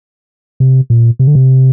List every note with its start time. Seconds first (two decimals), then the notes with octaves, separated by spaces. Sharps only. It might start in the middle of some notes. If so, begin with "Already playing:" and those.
0.60 C3
0.90 A#2
1.19 C3
1.27 D3
1.35 C3